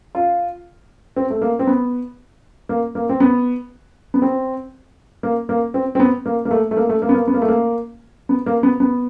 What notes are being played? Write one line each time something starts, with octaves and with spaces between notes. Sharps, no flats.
F4
C4
A3
A#3
C4
B3
A#3
A#3
C4
B3
B3
C4
A#3
A#3
C4
C4
B3
A#3
A#3
A3
A3
A#3
A3
A#3
B3
A#3
B3
A#3
A3
A#3
B3
A#3
B3
B3